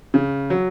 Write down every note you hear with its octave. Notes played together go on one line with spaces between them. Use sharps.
C#3
F#3